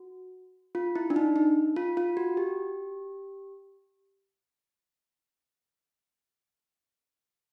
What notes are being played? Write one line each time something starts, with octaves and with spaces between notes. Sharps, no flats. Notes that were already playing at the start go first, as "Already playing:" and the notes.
Already playing: F#4
F4
E4
D4
D#4
D#4
F4
F4
F#4
G4